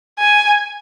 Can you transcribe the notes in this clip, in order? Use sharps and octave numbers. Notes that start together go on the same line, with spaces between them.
G#5